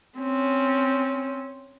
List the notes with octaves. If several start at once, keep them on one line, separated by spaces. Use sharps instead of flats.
C4 C#4